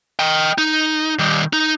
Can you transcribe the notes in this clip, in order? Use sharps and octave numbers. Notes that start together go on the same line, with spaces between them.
D#5 G5
D#4
D#3 G3
D#4